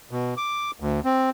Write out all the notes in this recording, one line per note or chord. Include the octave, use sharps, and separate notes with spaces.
B2
D6
D2
C4